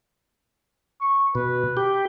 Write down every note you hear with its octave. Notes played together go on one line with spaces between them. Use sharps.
C#6
B2 B4
G4